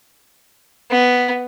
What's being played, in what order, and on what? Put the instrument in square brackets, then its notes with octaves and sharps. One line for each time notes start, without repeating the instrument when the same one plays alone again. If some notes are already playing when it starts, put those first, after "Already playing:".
[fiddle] B3